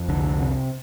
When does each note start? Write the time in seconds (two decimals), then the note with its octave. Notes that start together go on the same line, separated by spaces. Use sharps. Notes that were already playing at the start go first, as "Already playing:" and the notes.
Already playing: F2
0.08 C2 D3
0.40 C3